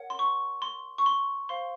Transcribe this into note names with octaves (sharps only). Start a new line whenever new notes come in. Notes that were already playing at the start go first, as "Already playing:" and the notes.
Already playing: A#4 C#5 F#5
C6
C#6
C6
C#6
C6
C5 F5 C6